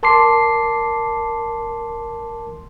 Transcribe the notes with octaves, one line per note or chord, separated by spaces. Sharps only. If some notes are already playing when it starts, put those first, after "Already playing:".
A#4 A5 C6 D6 C7